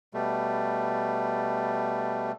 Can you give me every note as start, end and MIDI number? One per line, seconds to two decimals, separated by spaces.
0.14 2.32 47
0.14 2.32 55
0.14 2.32 57